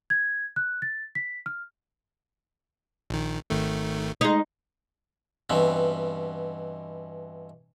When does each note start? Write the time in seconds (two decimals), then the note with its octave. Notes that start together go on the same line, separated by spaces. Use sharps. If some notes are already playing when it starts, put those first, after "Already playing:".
0.10 G#6
0.56 F#6
0.82 A6
1.15 B6
1.46 F6
3.10 A#1 D#3
3.50 G#1 D#3 A3
4.21 G#3 D#4
5.50 G2 B2 E3 C4